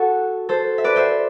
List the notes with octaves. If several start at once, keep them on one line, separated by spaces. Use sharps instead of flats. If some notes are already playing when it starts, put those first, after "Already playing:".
Already playing: F#4 A4
A4 C5
E5
B4 D5
C5 E5